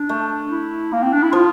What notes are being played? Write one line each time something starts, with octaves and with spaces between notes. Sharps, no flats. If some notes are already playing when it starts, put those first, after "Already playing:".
Already playing: D4
A3
E4
A#3
C4
D4
E4
F3 F4